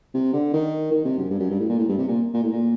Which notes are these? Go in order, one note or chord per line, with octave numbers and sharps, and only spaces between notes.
C3
D3
D#3
D#3
C3
F#2
G2
F#2
G2
A2
A#2
A2
G2
C3
A#2
A#2
A2
A#2